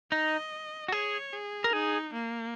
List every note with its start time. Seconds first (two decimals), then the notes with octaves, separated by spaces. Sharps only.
0.12 D#4 D#5
0.88 F#4
0.92 G#4 C#5
1.33 G#4
1.64 A#4
1.73 D#4 G#4
2.13 A#3